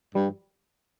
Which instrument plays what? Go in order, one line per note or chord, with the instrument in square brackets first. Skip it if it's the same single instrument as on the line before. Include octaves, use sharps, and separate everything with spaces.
[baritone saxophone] G2 [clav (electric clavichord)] G3